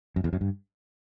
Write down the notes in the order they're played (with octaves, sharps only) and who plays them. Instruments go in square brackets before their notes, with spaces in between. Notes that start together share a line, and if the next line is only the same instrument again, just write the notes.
[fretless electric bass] F#2
E2
F#2
G2